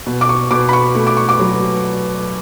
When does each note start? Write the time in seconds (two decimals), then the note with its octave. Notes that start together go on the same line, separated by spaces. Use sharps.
0.06 B2
0.21 D6
0.29 C#6
0.51 B2 D6
0.69 B5
0.73 C#6
0.95 A3
1.07 D6
1.17 C#6
1.29 D6
1.40 F#3